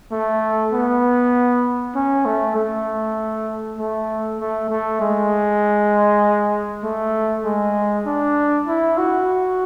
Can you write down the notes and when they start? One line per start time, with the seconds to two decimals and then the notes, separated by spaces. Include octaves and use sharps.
0.11 A3
0.72 B3
1.95 C#4
2.26 A3
2.55 A3
3.78 A3
4.39 A3
4.70 A3
5.00 G#3
6.84 A3
7.44 G#3
8.06 D4
8.67 E4
8.98 F#4